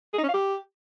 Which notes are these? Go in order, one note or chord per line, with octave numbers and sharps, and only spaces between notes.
G#4
D#4
C#4
F5
G4